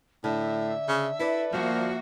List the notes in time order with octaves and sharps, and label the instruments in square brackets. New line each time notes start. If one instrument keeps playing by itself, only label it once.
[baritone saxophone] A2 [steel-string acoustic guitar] D3 [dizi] E5
[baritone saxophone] C#3
[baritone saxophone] E4 [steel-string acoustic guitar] A4 B4 D5
[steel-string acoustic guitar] D2 G3 [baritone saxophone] F3 [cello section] A#3 F#4